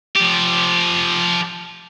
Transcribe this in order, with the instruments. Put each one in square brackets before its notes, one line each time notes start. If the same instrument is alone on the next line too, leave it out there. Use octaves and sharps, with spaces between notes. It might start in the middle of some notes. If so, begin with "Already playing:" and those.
[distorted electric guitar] F3 G4